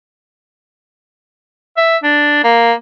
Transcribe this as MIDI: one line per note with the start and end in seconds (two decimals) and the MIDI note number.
1.77 1.97 76
2.03 2.43 62
2.44 2.73 58